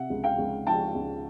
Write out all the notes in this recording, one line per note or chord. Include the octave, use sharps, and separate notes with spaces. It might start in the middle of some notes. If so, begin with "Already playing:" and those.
Already playing: C3 E5 F#5
C#2
F5 G5
C#2
F3 G5 A5
C#2